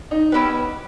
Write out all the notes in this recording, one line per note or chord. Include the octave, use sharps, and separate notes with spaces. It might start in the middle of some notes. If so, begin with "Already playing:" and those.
D#4
B3 C#4 E4 G4 B4